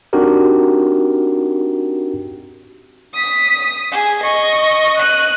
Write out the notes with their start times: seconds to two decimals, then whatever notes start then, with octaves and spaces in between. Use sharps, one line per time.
0.13 C4 D4 D#4 F#4 G4 A#4
3.14 D#6 B6
3.92 G#4
4.23 D#5 C#6
4.98 F#6 D#7